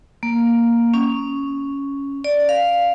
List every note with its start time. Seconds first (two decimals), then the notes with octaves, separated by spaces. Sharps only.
0.23 A#3
0.94 C#4
2.24 D5
2.49 F5